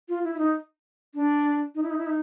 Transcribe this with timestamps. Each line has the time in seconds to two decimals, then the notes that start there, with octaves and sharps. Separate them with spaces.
0.09 F4
0.24 E4
0.35 E4
0.39 D#4
1.15 D4
1.75 D#4
1.83 E4
1.90 D#4
1.98 E4
2.06 D#4